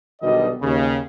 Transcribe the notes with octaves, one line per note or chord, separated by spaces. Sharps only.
B1 B2 D3 D#3 G3 D#5
D#2 C#3